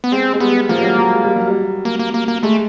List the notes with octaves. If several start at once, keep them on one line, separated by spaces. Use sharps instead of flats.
B3
G#3 C4
G#3
G3 B3
F3 A#3
G3
F#3
F#3
G#3
G3
F#3
G3
A#3
A#3
A#3
A#3
G#3 A3